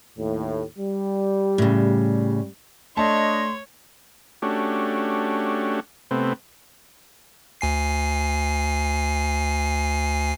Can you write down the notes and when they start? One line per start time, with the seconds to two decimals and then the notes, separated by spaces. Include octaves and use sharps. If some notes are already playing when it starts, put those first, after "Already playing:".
0.18 D#2 A2
0.78 G3
1.58 A2 C#3
2.97 A3 D4 C#5 D#5 A5 C6
4.42 A3 C#4 D4 F#4 G4
6.11 C3 A3 B3 C4
7.61 D2 G#5 C7